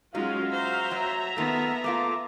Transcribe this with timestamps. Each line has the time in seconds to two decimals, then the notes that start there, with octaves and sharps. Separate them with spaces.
0.15 F#3 G#3 C#4 D#4 F4 F#4 F5
0.52 F#4 C5 E5 A#5
0.91 F#3
1.37 D#3 A3 B3 F4
1.84 A3 A#3 F4 D6